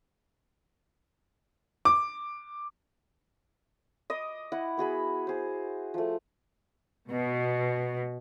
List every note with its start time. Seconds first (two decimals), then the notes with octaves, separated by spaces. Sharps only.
1.85 D6
4.10 D#5 D6 D#6
4.52 E4 F#5
4.77 B3 F#4 G#4 B5
5.27 G#4 C5
5.94 F3 A3
7.10 B2